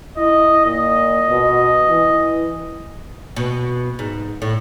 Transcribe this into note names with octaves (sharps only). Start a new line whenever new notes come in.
E4 D#5
A#2 D#5
B2
E3
B2
G#2
A2